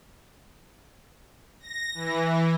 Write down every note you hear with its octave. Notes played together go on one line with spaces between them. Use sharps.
A#6
E3